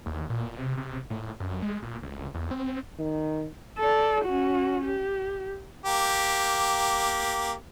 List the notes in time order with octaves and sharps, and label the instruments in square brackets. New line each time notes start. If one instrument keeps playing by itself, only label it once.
[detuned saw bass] D#2
A#2
C3
C3
A2
F#2
G#3
A#2
C#2
E2
C4
[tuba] D#3
[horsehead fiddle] A4 D5
C#4 F#4
G4
[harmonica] A#3 G4